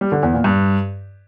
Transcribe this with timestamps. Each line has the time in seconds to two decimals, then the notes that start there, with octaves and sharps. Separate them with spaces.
0.01 G3
0.12 D3
0.23 E2
0.34 A#2
0.44 G2